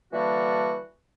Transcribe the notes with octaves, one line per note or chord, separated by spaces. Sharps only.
D3 E3 G3 A#3 D4 F#4